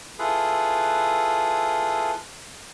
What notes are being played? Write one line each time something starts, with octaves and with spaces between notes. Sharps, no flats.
E4 F4 G#4 A4 B4